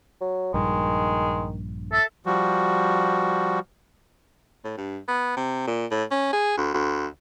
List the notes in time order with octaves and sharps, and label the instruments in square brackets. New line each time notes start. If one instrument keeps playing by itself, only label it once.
[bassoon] F#3
[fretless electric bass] A#1 G2 [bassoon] D#3 [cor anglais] G#3
[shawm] A4 [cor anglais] E5
[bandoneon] F3 G3 F#4
[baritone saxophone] A2
G2
B3
C3
A#2
A2
C#4
G#4
D2
D2